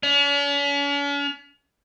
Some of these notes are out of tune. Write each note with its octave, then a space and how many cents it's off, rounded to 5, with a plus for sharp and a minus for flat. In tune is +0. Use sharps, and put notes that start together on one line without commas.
C#4 +45